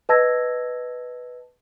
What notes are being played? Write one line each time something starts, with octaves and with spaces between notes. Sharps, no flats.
B4 D#5 A5 E6 G#6 A#6